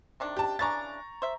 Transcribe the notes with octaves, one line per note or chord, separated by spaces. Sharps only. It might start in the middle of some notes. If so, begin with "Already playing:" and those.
C3 D#3 D4
G4 A5
C#3 E3 D4 A#5 C#6 A6
C5 E5